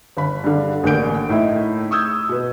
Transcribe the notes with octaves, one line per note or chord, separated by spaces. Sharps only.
G1 B5
G2 D3
A1 A2 D3 A#3 G6 D7
A2 D#4 E4 E5
C#6 D#6 E6 G6 G#6
B2 B4